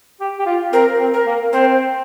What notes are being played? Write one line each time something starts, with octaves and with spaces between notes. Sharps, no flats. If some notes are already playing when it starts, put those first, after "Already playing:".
G4
G4
F4
C4 A#4
C4
A#4
A#3
C4 C5